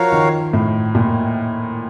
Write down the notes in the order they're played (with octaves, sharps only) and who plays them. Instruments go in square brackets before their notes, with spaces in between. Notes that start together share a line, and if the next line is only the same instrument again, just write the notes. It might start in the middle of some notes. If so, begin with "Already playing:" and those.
Already playing: [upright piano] F3 [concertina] F#4 A#4 C#5 F5
[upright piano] D#3
A2
A#2